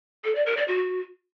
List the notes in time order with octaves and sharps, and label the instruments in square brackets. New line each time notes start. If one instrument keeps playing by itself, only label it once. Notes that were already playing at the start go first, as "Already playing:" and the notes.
[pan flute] A4
D5
A#4
D5
F#4